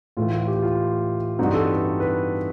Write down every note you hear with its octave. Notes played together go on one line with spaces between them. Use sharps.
A2 E3 A3 F4
F4
G4
F4
G2 E3 G3 C4 D#4 F#4
A4
B4
B4